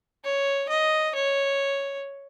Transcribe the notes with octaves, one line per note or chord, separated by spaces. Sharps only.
C#5
D#5
C#5